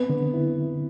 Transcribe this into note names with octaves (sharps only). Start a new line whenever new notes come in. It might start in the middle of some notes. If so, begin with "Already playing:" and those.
Already playing: B3 C4
D3
E4